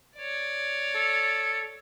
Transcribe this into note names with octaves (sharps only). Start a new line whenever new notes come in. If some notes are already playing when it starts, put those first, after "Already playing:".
C#5 D5
A4